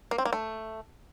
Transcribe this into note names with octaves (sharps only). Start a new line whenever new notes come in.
A#3
C4
A#3
A3